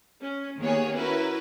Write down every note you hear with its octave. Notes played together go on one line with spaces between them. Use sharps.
C#4
D#3 A#3 B3 G4 G#4 C#5
C#4 E4 F#4 A#4 B4